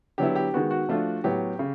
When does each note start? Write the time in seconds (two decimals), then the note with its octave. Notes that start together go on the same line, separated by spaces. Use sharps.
0.18 D3 F#3 B3 E4 G4
0.35 G4
0.54 D#3 G#3 B3 F#4
0.71 F#4
0.89 F3 A3 D4 F4
1.24 A2 F#3 B3 G4
1.59 C#3